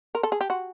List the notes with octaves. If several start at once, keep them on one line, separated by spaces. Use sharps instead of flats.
A#4
A4
G#4
G4
F#4